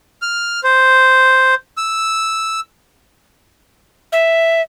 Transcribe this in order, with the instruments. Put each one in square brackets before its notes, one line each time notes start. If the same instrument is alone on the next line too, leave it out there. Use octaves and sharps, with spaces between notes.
[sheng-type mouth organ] F6
C5
E6
[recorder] E5